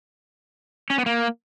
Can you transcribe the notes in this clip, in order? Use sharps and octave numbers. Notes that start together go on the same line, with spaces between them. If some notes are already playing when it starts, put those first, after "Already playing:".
C#4
B3
A#3